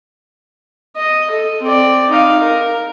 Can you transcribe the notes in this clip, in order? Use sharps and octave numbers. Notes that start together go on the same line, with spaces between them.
D#5
A4
C4 D5
D#4 F5
A#4